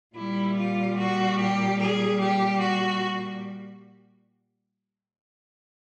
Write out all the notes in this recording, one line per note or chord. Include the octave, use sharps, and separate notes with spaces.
A#2 G3 E4
F4
F#4
G4
G#4
G4
F#4